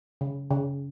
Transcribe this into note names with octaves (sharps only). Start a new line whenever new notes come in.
C#3
C#3